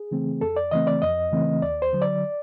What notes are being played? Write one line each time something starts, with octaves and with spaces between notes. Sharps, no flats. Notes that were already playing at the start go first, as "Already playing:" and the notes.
Already playing: G#4
C#3 E3 A3 C4
F2 A4
D5
C#3 E3 A3 C4 D#5
D5
F2 D#5
C#3 E3 A3 C4
D#2 D5
C5
D3 F#3
D5